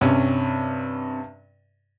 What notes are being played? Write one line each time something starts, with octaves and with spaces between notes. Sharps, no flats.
G2 C3 C#4